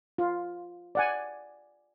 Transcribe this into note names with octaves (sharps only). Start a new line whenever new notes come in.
F4
D5 F#5 G#5